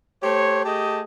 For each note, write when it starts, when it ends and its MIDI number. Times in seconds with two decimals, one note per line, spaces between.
0.23 0.64 57
0.23 0.64 67
0.23 0.64 72
0.23 0.64 73
0.65 1.01 57
0.65 1.01 67
0.65 1.01 68
0.65 1.01 75
0.65 1.01 81